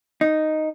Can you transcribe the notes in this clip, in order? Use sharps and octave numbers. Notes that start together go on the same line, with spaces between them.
D#4